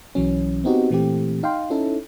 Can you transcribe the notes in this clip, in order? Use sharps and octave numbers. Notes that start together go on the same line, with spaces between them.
B1 E3 F#3 C#4
B3 C4 D#4 F#4 G4
A#2 E3 A3 C4 G4
D#4 F5 G5 C6
C#4 D#4 E4 A4